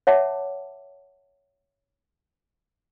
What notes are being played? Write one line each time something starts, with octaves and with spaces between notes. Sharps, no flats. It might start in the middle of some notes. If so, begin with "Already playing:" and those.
C#5 E5 F#5 A5 D6